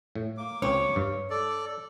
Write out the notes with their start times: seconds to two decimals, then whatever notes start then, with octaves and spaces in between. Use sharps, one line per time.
0.15 A2
0.38 A#3 D6
0.62 C#2 C4 C#5
0.96 G2
1.30 A4 D5